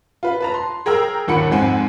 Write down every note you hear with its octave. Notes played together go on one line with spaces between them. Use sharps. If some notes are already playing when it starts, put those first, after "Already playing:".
F4 B4
B4 A5 A#5
C6
G#4 A#4 G5 A#5 E6
G1 D#2 A#2 F#5 B5 C#7
F2 G#2 C4 F#5 G#5